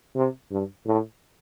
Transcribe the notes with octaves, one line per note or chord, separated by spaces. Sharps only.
C3
G2
A2